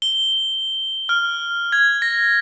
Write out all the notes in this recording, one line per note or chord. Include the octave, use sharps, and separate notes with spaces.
G7
F6
G#6
A#6